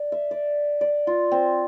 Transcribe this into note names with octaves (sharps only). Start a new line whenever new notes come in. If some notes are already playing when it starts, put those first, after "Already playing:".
Already playing: D5
E5
D5
D5
F4
C4